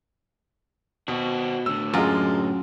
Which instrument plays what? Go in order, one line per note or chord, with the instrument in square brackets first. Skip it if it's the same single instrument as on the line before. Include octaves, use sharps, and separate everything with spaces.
[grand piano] B2 [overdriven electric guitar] C4 F#4
[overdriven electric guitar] A2 D3 [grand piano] E6
[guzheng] F#2 [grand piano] G#3 F4